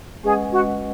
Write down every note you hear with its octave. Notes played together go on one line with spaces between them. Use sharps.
G#3 C#4 G#4 B4 D#5 F#5
F#4